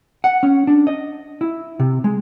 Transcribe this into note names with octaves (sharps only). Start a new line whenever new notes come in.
F#5
C#4
D4
D#5
E4
C3
G#3